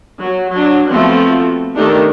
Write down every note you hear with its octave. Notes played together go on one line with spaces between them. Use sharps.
F#3
F#3 D4
F3 A3 B3 C4 F4 F#4
D#3 A3 D4 D#4 G4